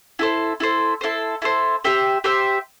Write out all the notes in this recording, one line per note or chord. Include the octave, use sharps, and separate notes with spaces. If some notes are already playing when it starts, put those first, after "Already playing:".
E4 A4 C5
E4 A4 C5
E4 A4 C5
E4 A4 C5
G4 C5 E5 G5
G4 C5 E5 G5